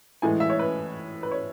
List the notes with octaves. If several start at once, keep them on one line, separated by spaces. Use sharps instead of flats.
A2 E3 G#3 G#5
E5
C#5
B4
B4
C#5